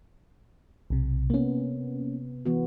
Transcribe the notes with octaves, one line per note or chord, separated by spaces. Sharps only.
B1 C3
C3 A#3 B3 C#4
E3 B3 F#4